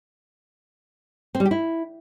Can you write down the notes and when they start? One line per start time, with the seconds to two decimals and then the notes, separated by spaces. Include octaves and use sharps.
1.35 C4
1.40 G3
1.45 G4
1.51 E4